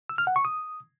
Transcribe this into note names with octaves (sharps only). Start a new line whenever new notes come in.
E6
F6
F#5
C#6
D#6